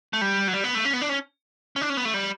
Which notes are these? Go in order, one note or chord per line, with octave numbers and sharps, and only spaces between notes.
A3
G3
F#3
G3
B3
A3
C#4
B3
D4
C#4
C#4
D4
C#4
B3
A3
G3